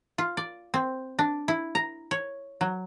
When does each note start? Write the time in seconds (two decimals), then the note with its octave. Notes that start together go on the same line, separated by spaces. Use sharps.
0.18 F4
0.37 D5
0.74 C4
1.19 D4
1.48 E4
1.75 A#5
2.11 C#5
2.61 F#3